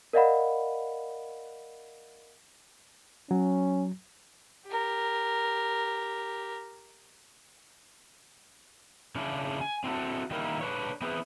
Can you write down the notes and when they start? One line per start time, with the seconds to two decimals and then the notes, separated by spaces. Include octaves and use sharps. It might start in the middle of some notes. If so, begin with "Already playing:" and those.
0.13 A#4 D5 D#5 F5 F#5 B5
3.31 F#3 C#4
4.67 G4 A#4
9.15 C#3 C#4 D4 E4
9.61 G#5
9.84 C4 E4 F#4 A4
10.31 D#3 G3 A#3 E4 A#4
10.61 D4 B4 C#5
11.01 B3 C4 E4 G#4 B4